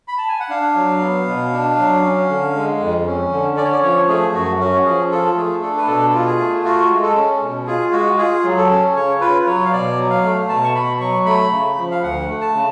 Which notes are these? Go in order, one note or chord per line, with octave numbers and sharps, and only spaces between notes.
B5
A5
G#5
F#5
D4 F5
F#3
B3
B2
D4
F#3
C#4
D3
G#3
F2
C#4
D3
C#4 D5
C#5
D5
F3 C#5
A3 G#4
F#2 F#4
C#4 F#4
F3 G#4
F4 A4
A3 G#4
D4 A4
B4
B2 A4
F4
G#4
A3
F4 F#4
G#3
A4
C#4
B2
F4 G#4
G#3 F#4
F4 G#4
F#3
A4
C#4
C#3 C#5
F4 B4
F#3 C#5
F5
B2 D5
F#3
F5
A3
B2 A5
C#6
B2 B5
F#3 C#6
A3 B5
C#3
F3
F5
D2 F#5
A3
A5
C#3